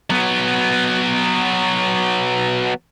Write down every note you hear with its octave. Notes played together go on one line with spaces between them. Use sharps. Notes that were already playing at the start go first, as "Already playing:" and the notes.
F#3 B3